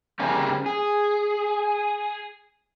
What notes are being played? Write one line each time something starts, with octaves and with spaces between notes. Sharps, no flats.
C#3 G3 A#3 C4 C#4
G#4